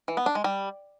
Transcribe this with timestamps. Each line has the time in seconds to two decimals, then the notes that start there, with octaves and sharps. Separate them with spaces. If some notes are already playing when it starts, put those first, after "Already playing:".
0.08 E3
0.17 B3
0.26 D4
0.35 G#3
0.44 G3